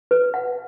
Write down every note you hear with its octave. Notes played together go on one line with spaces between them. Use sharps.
B4
F#5